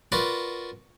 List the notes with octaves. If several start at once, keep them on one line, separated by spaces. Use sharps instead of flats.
F4 F#4 A#4 B4 D5